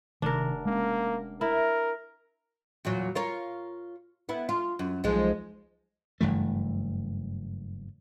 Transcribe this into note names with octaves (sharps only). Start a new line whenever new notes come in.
F1 C3 D#3 D4 A#4
G#3 A#3 C#4
E4 A#4
E2 A#2 F#3
F4 A#4 C#5
B3 E4
F4
F#2
B1 F3 G#3
F#1 G2 E3 A3